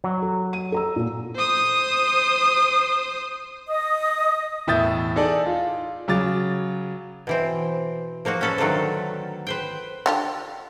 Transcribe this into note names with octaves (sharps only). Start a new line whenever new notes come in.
F#3
A4
D#7
A4 A#5 E6
A#2
C5 D#6
D#5 D#6
E1 A2 E5 D#6 G6 A6
D#4 G#4 A4 D5
F4
C#3 F#3 D6 A6
B2 E3 C4
F3 A#3 D#4 F#4
C#4 F#4 A4 B4
D3 D#3 F#3 A3 F4 A4
B4 C5 G5
D3 F4 G4